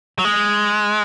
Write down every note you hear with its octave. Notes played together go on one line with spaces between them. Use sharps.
F#3
G#3